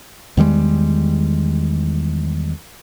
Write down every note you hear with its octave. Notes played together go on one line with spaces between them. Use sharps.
E2 D#3 G3 G#3